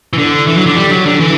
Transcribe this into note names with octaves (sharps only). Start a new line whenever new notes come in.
E3
D3
E3
F#3
D3
G3
F#3
D3
E3